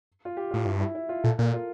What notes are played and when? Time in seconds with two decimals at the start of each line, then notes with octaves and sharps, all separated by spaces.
0.25 F4
0.37 G4
0.51 F4
0.54 A2
0.65 G2 E4
0.80 E4
0.95 E4
1.09 F4
1.24 A#2 A4
1.38 A#2 A#4
1.54 F4